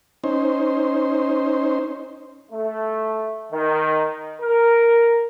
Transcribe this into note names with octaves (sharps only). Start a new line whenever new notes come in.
C#4 D#4 C5
A3
D#3
A#4